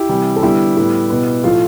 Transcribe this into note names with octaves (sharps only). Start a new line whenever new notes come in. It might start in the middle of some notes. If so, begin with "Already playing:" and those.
Already playing: E4 G4
C3 E3 G3
A4
D3 G3 B3 E4 G4
A2 G3 B3
B2 B3
A2 F3 A3 F4